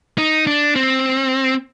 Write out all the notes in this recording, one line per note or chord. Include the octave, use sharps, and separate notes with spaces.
D#4
D4
C4